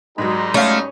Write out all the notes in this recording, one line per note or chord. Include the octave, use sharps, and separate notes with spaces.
G#2 D#3 F#3 G3 D#4
A3 C#4 F5